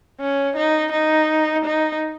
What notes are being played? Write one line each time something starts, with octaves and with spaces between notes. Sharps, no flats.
C#4
D#4
D#4
D#4